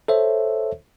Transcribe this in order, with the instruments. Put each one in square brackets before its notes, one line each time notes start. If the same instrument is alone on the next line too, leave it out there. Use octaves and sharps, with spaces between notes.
[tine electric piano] A4 C5 C#5 E5